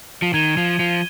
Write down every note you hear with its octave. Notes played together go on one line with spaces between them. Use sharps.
F3
D#3 G#6 D#7 G7
F3
F3